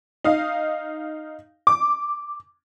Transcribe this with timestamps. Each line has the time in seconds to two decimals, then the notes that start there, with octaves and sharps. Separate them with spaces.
0.24 D#4 F5
1.67 D6